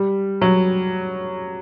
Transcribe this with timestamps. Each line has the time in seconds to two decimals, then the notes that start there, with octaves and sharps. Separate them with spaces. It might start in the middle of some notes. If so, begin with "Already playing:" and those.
Already playing: G3
0.42 F#3